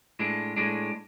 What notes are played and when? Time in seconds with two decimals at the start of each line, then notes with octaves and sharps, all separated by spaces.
0.19 A2 G#3 D4
0.56 A2 G#3 D4